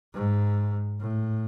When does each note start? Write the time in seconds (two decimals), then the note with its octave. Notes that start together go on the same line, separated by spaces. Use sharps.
0.14 G#2
1.00 A2